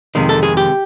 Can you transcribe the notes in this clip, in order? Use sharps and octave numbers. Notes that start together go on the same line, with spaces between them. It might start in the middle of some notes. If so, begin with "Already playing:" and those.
F2 C3 D#3 G#3
A4
G#4
G4